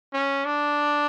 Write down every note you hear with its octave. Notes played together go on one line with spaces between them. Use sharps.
C#4
D4